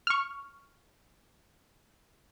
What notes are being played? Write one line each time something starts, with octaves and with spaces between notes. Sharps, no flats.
C#6 F6